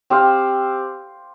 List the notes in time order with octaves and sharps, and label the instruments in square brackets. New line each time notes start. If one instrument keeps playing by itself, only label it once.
[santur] C4 G4 C5 F5